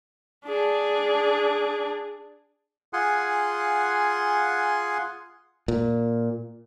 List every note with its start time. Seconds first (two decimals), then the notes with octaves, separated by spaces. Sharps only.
0.46 D4 G#4
2.93 F4 G#4 F#5 G#5 C6
5.68 A#2